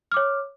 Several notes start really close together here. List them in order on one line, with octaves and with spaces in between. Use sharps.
F6 D6 C#5